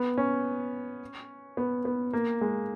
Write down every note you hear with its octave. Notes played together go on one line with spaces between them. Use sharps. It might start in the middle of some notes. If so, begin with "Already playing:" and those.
Already playing: B3
C#4
B3
B3
A#3
G#3